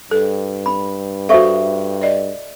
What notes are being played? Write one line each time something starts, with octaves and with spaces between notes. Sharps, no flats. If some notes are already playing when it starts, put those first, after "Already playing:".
G2 A4
B5
F#4 A4 C5 E5 F5 C#6
D5 D#5